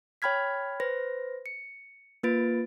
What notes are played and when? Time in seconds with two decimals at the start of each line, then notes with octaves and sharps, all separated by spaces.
0.22 C#5 G5 B5 F6 G#6 B6
0.80 B4 C5 A#6
1.46 C#7
2.23 A#3 F4 B4 A6 D7